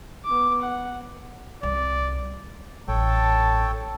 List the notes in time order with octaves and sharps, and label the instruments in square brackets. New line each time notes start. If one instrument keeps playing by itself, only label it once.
[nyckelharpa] B3 D6
F#5
[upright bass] C2 [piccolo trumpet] D5
[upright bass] A1 [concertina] A4 C#5 G5 [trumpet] A5